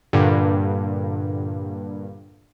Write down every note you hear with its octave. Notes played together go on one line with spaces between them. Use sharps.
G2 A#2 D3